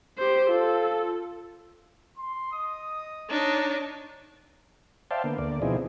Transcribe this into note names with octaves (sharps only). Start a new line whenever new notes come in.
G4 C5
F4 A4
C6
D#5 D#6
D4 D#4 C#5
C5 D5 E5 F5 G5 A5
D3 A#3 B3
D2 A#3 D5
B2 F3 C4 D#4 E4 G#4